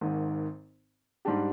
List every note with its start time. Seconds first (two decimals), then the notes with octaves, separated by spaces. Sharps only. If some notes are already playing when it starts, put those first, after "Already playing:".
0.01 G#1 G#2 D#3
1.25 G#2 G3 D4 G4